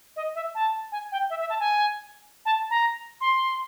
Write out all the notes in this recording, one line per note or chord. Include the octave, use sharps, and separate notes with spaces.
D#5
E5
A5
G#5
G5
E5
E5
A5
G#5
A5
A#5
C6